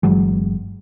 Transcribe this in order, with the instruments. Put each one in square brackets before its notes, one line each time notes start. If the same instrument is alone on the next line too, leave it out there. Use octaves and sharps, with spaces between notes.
[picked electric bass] G1 E3 F#3 G#3